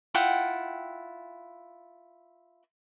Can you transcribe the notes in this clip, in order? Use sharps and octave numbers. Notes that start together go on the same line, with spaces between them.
E4 F4 F#5 G5